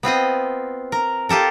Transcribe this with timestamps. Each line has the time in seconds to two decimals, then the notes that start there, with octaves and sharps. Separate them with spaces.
0.03 B3 C4 F4 D#5
0.92 A#4
1.29 F4 G4 A4 A#4